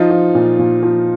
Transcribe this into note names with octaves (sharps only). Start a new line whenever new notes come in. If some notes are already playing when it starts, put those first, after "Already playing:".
Already playing: F3 D#4 F4
F3
A#2
A#2
F3